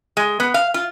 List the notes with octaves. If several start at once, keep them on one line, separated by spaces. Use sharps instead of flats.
G#3
B3
F5
F4